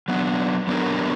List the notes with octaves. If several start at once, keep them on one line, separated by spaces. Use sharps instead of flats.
F#3 B3 D4
F#3 B3 D4 G4 A#4